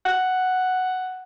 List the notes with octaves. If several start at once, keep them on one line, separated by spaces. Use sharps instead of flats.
F#5